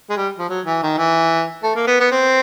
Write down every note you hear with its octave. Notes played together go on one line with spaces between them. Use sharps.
G#3
G3
F3
F#3
E3
D#3
E3
A3
A#3
B3
B3
C4